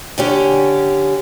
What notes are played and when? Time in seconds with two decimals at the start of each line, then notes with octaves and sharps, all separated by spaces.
0.18 D3 C#4 G4